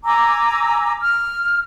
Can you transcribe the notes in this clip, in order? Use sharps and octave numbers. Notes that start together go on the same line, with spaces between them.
G#5 A#5 D6 E6
F6